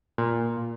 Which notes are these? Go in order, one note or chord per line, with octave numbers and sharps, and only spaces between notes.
A#2